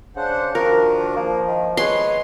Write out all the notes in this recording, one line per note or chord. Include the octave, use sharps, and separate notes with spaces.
C#3 D4 C5 F#5
D#3 F3 D4 F#4 A#4
F3 A#3
D#3
G#3 B4 C#5 C6